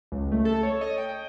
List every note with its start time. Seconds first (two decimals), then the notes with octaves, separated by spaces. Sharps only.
0.12 C#2
0.32 A3
0.45 A4
0.63 C#5
0.81 D#5
0.98 G5